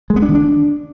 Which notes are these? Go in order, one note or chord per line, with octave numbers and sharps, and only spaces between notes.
G#3
B3
D4
D#3
D4